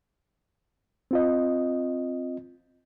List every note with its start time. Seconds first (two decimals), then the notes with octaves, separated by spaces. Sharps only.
1.11 C4 F4 D#5